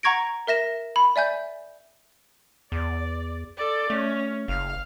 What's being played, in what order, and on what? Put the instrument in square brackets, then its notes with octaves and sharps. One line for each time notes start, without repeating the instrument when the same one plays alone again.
[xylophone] F#5 A#5 C#6 G#6 A#6 D7
A#4 E5 A#6 E7
B5
D5 E5 G#5 G6
[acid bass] E2 [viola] D5
[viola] A4 D5
[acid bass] A3 [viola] C#4
[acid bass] F#1 [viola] F5